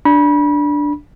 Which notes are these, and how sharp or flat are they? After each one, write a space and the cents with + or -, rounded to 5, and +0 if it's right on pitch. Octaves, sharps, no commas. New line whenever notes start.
D4 +0 B5 -30